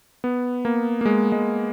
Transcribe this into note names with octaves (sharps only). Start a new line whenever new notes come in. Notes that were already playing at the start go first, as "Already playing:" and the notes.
B3
A#3
A#3
G#3
G#3